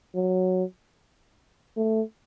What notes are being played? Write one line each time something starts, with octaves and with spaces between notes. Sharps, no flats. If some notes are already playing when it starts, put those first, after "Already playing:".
F#3
A3